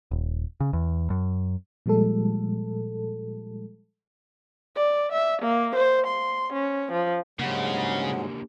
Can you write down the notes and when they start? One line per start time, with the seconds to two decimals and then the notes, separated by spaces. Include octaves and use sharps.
0.11 D#1
0.60 C#3
0.73 E2
1.10 F#2
1.86 A#2 F3 G3 G#3 A4
4.76 D5
5.13 E5
5.42 A#3
5.76 C5
6.07 C6
6.53 C#4
6.92 F3
7.39 G#2 C#3 F#3 G#3 A#3 D4 G4 F#5